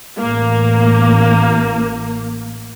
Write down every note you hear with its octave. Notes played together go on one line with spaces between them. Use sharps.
A1 A#3